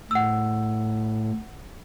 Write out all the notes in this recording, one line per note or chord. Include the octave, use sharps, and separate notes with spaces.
A2 F#5 E6